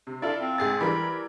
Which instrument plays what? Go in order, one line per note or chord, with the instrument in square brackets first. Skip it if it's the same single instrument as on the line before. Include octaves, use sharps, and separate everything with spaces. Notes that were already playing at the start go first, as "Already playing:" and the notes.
[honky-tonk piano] C3
[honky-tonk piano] E4 F4 A4 [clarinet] D5
[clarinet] C4
[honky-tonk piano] G#2 G#4 A6
[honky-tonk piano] E3 G3 A#4 [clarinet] B5